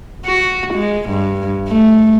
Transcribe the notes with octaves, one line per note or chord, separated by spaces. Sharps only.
F#4
G#3
G2
A3